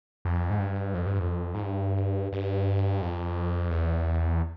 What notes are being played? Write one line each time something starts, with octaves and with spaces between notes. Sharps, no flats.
F2
G#2
G2
F2
G2
F2
G#2
G2
G2
F2
E2